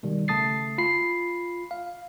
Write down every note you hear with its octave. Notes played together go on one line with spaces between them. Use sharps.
B2 D#3 G3
C#3 A3 A5 D#6 A6 C7
F4 B5 C7
F5